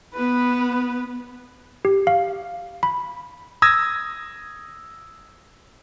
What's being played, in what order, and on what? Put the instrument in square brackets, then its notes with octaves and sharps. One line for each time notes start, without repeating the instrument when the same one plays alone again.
[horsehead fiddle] B3 B4
[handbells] G4
F5
B5
[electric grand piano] D#6 E6 G#6 A#6